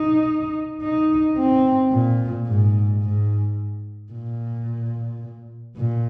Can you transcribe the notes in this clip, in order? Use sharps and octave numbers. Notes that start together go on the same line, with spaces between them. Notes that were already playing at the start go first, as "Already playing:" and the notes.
Already playing: D#4
D#4
C4
A#2
G#2
G#2
A#2
A#2